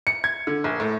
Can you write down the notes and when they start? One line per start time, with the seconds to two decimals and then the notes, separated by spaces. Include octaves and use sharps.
0.07 C#7
0.24 G#6
0.47 D3
0.64 A#1
0.80 A2